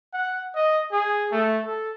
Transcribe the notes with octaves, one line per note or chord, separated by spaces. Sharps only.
F#5
D#5
G#4
A3
A4